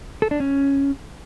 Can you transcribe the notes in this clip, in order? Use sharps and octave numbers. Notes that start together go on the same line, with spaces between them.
A4
D4
C#4